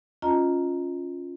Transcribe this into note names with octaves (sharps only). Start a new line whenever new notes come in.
C#4 F4 D#5 A5 A#5